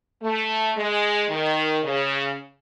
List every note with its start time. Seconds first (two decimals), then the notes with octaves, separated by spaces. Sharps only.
0.22 A3
0.76 G#3
1.29 D#3
1.83 C#3